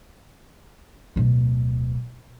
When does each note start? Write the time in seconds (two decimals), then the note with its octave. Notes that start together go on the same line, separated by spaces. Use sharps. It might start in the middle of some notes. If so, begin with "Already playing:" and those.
1.16 D1 B2